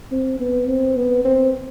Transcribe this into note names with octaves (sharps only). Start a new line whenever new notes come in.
C4
B3
C4
B3
C4